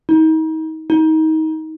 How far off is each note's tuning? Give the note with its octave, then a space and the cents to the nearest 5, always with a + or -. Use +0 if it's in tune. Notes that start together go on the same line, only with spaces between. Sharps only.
D#4 +35
D#4 +25